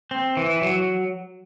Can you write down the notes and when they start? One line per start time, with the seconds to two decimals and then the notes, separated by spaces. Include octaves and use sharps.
0.11 C4
0.37 E3
0.62 F#3